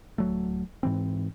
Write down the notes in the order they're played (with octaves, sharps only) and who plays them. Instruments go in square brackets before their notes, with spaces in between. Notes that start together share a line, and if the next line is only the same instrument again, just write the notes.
[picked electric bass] D1 F#3 A3
G#2 E3 C4